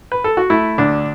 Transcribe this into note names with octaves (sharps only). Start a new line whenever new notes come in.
B4
A4
F#4
A3 E4
D2 D4